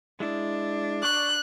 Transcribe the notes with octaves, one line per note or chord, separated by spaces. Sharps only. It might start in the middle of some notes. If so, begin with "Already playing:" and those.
G#3 D4 E4
D5 C#6 D6 F#6